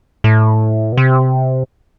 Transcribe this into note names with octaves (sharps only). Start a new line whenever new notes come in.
A2
B2
C3